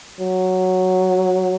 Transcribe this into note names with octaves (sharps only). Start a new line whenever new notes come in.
F#3